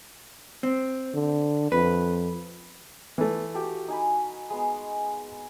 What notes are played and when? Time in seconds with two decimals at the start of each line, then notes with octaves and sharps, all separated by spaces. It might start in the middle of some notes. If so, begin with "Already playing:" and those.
0.63 C4
1.14 D3
1.72 F2 B4
3.18 E3 A3
3.54 F#4 G4 A4
3.88 D#4 G#5 B5
4.50 G#3 B3